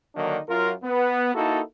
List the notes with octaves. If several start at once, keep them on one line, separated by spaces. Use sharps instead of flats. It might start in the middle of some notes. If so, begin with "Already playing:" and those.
D3 D#3 F#3 A#3 D4 D#4
F#2 F4 A#4
B3
A#3 D#4 E4 F#4 A4